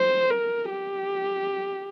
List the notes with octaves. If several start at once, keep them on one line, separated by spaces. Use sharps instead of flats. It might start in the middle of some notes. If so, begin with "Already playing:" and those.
Already playing: C5
A#4
G4